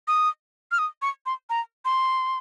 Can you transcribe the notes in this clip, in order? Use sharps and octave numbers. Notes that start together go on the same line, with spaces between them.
D#6
F6
D#6
C#6
C6
A#5
C6